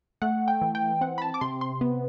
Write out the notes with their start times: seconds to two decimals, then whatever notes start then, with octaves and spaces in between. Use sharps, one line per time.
0.22 A3 F#5
0.48 G5
0.62 E3
0.75 G5
1.01 C4 F#5
1.18 B5
1.22 A5
1.34 D6
1.41 C3 C6
1.61 C6
1.81 B3